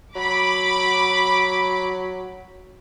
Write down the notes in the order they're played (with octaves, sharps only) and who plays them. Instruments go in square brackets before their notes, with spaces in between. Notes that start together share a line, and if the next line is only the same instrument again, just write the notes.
[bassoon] F#3 [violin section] B5 D6